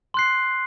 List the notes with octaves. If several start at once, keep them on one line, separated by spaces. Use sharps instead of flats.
C6 F#6 C7